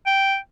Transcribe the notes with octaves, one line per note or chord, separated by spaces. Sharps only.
G5